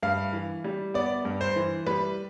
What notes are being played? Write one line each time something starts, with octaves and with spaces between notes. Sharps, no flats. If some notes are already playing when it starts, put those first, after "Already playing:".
G2 F5
E3
G3
B3 D5
G2
C5
E3
G3 B4